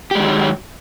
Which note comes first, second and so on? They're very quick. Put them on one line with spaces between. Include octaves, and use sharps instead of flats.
G4 G#3 D#3 F#3